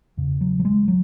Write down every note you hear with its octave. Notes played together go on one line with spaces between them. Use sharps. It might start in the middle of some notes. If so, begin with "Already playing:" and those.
E2 C#3
F#3
F#3
G#3
F#3